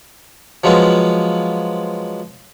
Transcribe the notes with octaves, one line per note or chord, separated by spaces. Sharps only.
F3 F#3 G#3 B3 F4